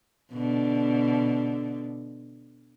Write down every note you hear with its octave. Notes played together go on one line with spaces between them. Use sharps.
B2 D3